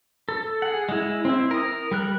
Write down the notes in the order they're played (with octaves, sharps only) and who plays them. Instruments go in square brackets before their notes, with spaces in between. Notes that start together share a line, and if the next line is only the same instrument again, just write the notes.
[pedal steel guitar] A4
G#4 F#5
G#3 E4
C4 E4
A#4 D#6
G3 A#4 F#6